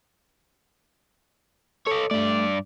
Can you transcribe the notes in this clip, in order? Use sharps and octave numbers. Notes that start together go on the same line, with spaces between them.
A4 C#5 D#5
G2 A3 D5